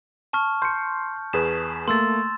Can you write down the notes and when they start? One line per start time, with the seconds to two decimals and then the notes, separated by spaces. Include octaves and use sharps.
0.33 A5 C#6 F6
0.62 C6 G6 C#7
1.33 E2 G#4 B4 E7
1.88 A3 A#3 C6 E6 A6